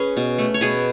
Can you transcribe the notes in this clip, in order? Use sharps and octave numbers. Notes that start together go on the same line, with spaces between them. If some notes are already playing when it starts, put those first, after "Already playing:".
Already playing: C#4 G#4 B4
B2
A3
C#5
B2 G#4 B4